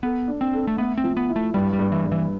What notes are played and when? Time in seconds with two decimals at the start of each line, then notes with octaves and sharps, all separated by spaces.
0.03 B3 A4
0.28 D4
0.41 C4
0.53 A4
0.67 A3
0.78 A3 B3
0.98 C4
1.04 F3
1.17 B3
1.29 E4
1.36 A3
1.54 G2 G3
1.73 G3
1.79 G2
1.92 E3
2.05 G2
2.12 E3